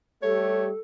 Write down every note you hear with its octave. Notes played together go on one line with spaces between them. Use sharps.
G3 A3 G4 A4 C#5